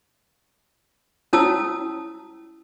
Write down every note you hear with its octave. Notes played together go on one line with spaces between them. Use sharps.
C#4 E4 A5 D#6 E6